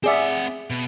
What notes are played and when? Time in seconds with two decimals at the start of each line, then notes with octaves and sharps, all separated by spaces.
0.04 C4 G#4 D5 E5 F#5
0.70 B2